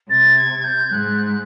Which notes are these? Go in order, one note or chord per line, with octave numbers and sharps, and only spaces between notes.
C3 A6
G#6
G#6
G6
G#2 F#6